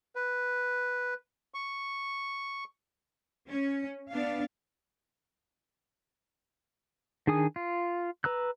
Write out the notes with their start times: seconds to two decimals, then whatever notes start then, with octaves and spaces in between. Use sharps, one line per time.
0.15 B4
1.54 C#6
3.49 C#4
4.09 B3 D4 F5
7.27 D#3 D4 G#4 G#5 D#6
7.56 F4
8.24 B4 A#5 E6 F#6